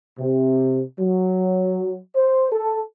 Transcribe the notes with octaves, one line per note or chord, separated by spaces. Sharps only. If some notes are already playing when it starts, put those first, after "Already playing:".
C3
F#3
C5
A4